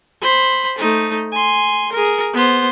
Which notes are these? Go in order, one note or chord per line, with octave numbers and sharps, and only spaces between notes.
C5 B5
A3 D#4
G#5 C6
G#4 A#4
B3 C5